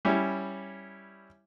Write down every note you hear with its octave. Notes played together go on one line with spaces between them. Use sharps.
G3 C#4 E4